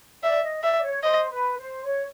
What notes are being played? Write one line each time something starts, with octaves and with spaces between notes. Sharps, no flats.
D5 E5
D#5
D5 E5
C#5
C5 D#5
B4
C5
C#5